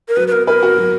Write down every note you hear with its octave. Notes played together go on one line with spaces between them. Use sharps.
A#4
F#3 B4
B4
B3 A#4
A#4 B4
F#4
F#3